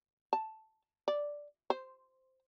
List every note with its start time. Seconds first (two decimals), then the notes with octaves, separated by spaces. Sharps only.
0.33 A5
1.08 D5
1.70 C5